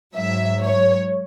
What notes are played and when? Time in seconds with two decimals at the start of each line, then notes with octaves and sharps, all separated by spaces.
0.15 G#2 F#3 E5
0.62 C#5